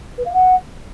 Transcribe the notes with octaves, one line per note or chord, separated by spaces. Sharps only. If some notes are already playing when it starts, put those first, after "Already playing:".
B4
F5
F#5